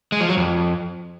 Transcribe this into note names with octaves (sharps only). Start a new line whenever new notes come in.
G#3
F3
F#3
F2